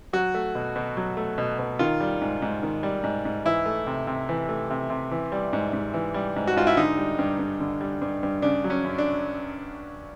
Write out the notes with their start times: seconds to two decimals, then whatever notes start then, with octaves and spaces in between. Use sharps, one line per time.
0.13 F#3 F#4
0.34 A3
0.55 B2
0.76 B2
0.97 F#3
1.17 A3
1.38 B2
1.59 B2
1.79 D#3 F4
2.00 G3
2.21 G#2
2.42 G#2
2.63 D#3
2.83 G3
3.04 G#2
3.25 G#2
3.45 E3 E4
3.66 A3
3.87 C3
4.07 C3
4.29 E3
4.49 A3
4.70 C3
4.90 C3
5.11 E3
5.32 G3
5.53 G#2
5.73 G#2
5.94 E3
6.14 G3
6.36 G#2
6.47 F#4
6.56 G#2 F4
6.67 E4
6.77 D3 D#4
6.97 G3
7.19 G2
7.39 G2
7.60 D3
7.81 G3
8.01 G2
8.23 G2
8.42 C#3 D4
8.64 F#3
8.70 C#4
8.85 F#2
8.98 D4